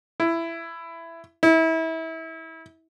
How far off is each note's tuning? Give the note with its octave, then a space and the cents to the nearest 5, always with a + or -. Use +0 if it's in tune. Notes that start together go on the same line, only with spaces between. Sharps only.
E4 +15
E4 -30